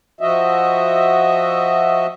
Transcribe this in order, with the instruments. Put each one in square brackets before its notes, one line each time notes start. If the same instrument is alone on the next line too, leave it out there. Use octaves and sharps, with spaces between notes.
[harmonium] F3 F#4 D#5 E5